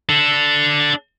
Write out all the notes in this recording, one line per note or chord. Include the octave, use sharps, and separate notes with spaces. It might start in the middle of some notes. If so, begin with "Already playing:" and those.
D4 A4